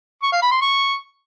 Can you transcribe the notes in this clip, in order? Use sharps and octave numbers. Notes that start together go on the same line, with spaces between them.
C#6
F5
B5
C6
C#6